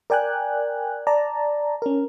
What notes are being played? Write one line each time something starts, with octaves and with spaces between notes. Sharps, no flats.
A#4 D5 G5 G#5 F#6
D5 A5 A#5
C#4 A#4